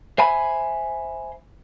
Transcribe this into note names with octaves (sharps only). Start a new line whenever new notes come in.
C5 E5 G#5 B5